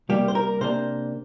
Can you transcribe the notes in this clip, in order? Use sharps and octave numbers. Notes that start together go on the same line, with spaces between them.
C3 G3 A#3 G4
C5
A#4
C3 A#3 D4 C5